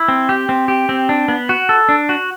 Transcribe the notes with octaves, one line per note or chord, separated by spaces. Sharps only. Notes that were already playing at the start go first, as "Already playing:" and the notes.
Already playing: E4
C4
G4
C4
G4
C4
D4
B3
F#4
A4
D4
F#4